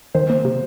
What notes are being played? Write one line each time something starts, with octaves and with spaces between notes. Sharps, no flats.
D#3 C5
A#3
C3